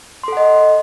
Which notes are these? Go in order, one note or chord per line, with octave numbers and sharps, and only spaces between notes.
A4 D#5 F#5 C6